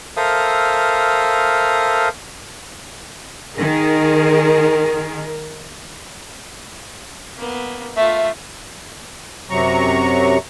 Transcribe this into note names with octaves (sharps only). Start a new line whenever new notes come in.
A4 A#4 C5 E5 F5 D#6
D#3 G#4 A#4
A#3 B3
A3 F4 E5
F#2 C3 F#3 A#5 C#6